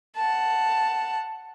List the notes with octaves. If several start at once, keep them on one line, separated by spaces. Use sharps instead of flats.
F#5 A5